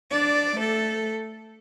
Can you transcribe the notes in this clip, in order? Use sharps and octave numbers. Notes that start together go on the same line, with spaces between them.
D4 D5
A3 A4